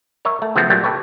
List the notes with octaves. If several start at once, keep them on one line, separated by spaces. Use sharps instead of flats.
A#4 C#5 E5
A3
C#3 F3 F#3 A3 B3 C4
A#2 F#3 G3 A3 G4
G4 A4 B4 C#5